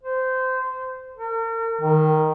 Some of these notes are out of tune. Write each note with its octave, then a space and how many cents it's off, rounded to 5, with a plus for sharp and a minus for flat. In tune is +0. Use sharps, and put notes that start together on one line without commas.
C5 -20
A#4 -40
D#3 +0